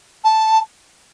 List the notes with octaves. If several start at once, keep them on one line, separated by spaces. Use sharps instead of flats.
A5